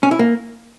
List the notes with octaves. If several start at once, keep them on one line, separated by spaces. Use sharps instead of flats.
C#4
E4
A#3